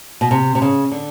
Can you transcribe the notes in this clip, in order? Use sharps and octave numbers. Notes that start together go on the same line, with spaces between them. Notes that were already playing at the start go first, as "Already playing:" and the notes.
B2
C3
C3
C#3
D3